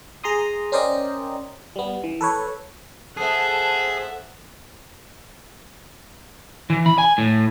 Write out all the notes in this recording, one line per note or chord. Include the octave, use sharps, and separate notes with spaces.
G#4 A#5 C6 D#6
C#4 A#4 C5 D5 D#5 G5
G3 B3
E3
A4 B4 C#5
G#4 A4 C5 E5 F#5 A5
E3
B5
G#5
A2